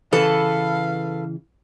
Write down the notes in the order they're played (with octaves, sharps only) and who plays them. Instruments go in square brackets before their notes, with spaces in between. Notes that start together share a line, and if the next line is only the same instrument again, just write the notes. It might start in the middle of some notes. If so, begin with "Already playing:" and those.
[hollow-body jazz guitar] C#3 E3 [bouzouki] A4 B4 A5 [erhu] F5